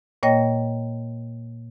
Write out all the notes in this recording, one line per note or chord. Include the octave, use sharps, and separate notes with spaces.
A#2 A#3 C#5 D#5 G5 A#6